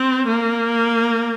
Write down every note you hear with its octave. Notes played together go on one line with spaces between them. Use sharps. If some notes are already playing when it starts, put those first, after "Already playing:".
Already playing: C4
A#3